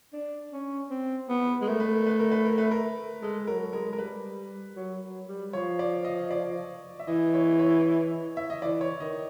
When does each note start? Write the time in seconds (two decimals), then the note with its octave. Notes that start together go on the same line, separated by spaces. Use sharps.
0.13 D4
0.52 C#4
0.90 C4
1.29 B3
1.61 G#3
1.68 A3 A#4
1.80 B4
1.94 A#4
2.07 B4
2.20 A#4
2.32 B4
2.45 A#4
2.58 B4
2.71 A#4
3.22 G#3 A4
3.47 F#3 A#4
3.73 G#3 A#4
3.93 A#4
3.98 G3 B4
4.76 F#3
5.02 F#3
5.28 G3
5.53 F3 C#5
5.79 D5
6.05 D#5
6.31 D5
6.99 E5
7.07 E3 D#5
7.34 C#5
7.59 C#5
8.37 E5
8.50 D#5
8.62 E3 D5
8.81 C#5
9.00 D#3 D#5